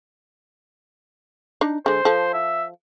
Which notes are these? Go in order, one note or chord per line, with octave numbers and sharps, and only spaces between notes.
D4 D#4
D3 G#3 C5
F3 A4
E5